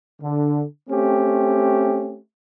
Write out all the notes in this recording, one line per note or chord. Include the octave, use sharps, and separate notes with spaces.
D3
A3 C4 C#4 G4